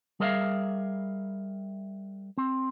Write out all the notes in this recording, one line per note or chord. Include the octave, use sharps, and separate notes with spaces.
G3 G#4 A#4 D5 E5 F5
C4